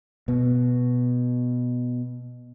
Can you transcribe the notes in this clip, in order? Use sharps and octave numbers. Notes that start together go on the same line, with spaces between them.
B2 B3